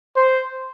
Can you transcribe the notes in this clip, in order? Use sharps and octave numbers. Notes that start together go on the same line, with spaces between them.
C5